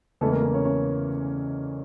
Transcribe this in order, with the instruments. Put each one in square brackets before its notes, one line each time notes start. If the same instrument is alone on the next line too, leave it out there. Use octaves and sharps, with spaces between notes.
[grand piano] E2 C#3 E3 G#3 [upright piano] A3 A4
[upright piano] A#3 A#4
A#3 A#4
C#4 C#5
C#4 C#5